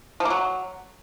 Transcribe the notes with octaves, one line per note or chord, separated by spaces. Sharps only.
F3
A#3
F#3